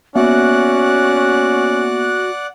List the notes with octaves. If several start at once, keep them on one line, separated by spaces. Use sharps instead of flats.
A#3 B3 C#4 F#4 D5 E5 F#5 F#6